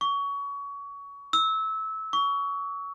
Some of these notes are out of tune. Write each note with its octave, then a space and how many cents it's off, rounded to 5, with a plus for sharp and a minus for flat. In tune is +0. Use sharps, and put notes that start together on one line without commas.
C#6 +25
E6 -20
C#6 +25